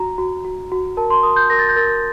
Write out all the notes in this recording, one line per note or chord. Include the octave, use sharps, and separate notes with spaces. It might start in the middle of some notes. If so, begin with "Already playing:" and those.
Already playing: F#4 A#5
F#4
F#4
F#4
A#4 A5
C6
A#4 D#6
G6
A#4 A#6
A6
G6
A#4 A6